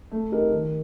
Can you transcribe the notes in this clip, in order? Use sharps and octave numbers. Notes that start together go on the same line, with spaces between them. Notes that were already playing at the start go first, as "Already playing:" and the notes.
A3
D#4 G4 A#4
D#3